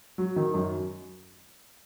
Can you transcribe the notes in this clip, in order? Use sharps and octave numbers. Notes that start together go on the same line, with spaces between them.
F#3
D#3
F#2